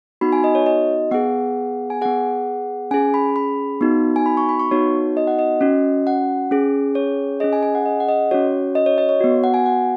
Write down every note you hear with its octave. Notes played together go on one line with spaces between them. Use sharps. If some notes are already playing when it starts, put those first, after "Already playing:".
B3 D#4 F#4 B5
G#5
D#5
C#5
D#5
B3 G#4 F#5
G#5
B3 G#4 F#5
C#4 G#4 G#5
B5
B5
B3 D#4 F#4
G#5
B5
C#6
B5
C#6
B3 D#4 F#4 C#5
D#5
F#5
D#5
C#4 F#4
F#5
C#4 G#4
C#5
C#4 G#4 D#5
G#5
G#5
F#5
D#5
F#5
D#5
C#4 F#4 C#5
D#5
C#5
D#5
C#5
B3 F#4
F#5
G#5
F#5